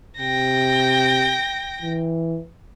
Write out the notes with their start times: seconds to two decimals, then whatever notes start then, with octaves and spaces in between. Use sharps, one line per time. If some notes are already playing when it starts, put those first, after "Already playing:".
0.19 C3 G5 A#6
1.82 E3